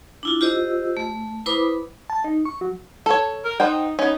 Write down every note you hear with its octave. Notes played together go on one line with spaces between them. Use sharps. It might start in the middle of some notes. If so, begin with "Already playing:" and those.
D4 E4 F4
F4 G4 C5 D#5 E6
A3
E4 B4 C5 B5 D6 D#6
A5
D#4
C#6
F#3
A4 C#5
A#4
D#4 C5 F#5 G5
B3 C#4 D#4